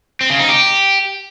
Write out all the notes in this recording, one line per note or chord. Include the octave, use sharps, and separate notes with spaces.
C4
C#3
D#4
G4